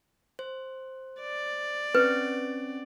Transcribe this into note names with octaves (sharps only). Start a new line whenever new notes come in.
C5
D5
C4 C#4 B4